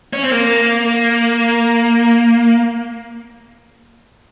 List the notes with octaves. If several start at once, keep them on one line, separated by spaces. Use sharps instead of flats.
C#4
C4
A#3